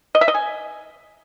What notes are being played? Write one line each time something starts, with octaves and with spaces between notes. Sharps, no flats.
D#5
E5
D#5
G#5